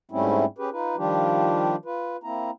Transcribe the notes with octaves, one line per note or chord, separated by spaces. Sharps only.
G#2 G3 A3 C4 C#4 E4
C#4 G4 G#4 B4
D#4 F4 B4
D#3 F3 G3 D4 F4 G4
F4 B4
A#3 C4 E4 A#5